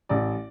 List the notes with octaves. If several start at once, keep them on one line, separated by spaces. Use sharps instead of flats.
A1 D5